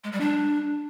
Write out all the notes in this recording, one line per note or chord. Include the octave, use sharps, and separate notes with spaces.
G#3
G3
D4